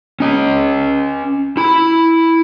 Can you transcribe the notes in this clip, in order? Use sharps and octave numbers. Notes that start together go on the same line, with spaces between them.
C#4 D#5
E4 B5